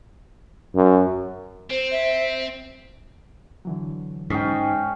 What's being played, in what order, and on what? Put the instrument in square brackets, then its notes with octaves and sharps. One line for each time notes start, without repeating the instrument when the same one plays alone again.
[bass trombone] F#2
[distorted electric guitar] C4 [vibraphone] C5
[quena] E5
[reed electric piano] D3 E3 F#3
[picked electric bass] G#2 [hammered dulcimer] C#4 D#5 G5